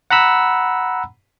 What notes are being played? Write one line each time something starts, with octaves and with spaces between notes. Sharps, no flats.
F#5 A#5 B5 E6